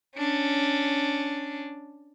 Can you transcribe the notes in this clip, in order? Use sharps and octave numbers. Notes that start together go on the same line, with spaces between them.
C#4 D4